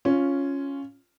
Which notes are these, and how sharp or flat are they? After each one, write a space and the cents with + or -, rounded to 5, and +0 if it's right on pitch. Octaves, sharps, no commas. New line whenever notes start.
C#4 +0 F4 +0